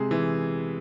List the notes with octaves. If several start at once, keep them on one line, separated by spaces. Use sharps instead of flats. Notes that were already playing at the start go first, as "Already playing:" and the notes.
Already playing: C3 G#3 G#4
E3